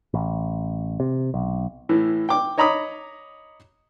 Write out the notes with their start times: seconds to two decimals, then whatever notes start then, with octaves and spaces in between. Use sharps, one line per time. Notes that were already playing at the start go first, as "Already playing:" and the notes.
0.14 A1
1.00 C3
1.34 B1
1.89 A2 E3
2.29 G5 D6
2.58 C#5 D#5 A#5 B5 D6 D#6